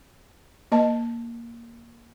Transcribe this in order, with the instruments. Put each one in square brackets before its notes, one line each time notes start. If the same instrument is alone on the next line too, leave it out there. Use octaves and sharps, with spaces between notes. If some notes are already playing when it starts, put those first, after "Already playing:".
[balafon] A#3 D#5 A5